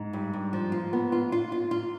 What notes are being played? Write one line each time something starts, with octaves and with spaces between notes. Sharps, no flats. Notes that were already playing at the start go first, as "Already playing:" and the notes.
Already playing: G#2
G2
G2
F3
F4
B3
F4
F4
F4
F4